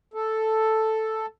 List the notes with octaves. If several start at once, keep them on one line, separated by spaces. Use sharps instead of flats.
A4